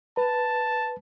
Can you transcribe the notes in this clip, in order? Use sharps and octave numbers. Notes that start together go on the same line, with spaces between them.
B4 A5